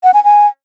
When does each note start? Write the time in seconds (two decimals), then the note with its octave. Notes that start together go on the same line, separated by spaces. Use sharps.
0.03 F#5
0.14 G#5
0.24 G#5